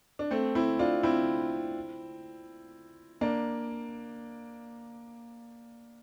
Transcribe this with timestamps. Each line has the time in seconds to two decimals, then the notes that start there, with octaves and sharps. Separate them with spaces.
0.19 D4
0.31 A3 C4
0.55 C4 E4
0.79 D4 F4
1.03 C4 E4
3.21 A#3 D4